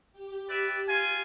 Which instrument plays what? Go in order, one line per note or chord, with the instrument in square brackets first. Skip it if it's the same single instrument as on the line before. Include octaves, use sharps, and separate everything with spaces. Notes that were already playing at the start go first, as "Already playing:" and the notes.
[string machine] G4
[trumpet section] B4 D5 E5
F4 G#5